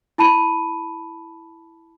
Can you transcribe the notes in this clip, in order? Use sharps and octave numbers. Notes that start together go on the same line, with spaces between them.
E4 A5 B5 D#7